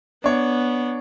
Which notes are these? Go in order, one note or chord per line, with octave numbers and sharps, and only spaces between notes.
B3 D4 C#5